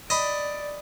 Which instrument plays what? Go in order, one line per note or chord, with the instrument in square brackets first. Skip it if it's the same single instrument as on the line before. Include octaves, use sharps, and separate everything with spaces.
[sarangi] D5 [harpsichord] D#5 B5